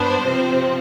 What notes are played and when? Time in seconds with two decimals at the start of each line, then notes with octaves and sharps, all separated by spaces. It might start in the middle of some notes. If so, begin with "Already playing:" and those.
Already playing: G2 B3 D4 C5
0.26 C3 F3 C4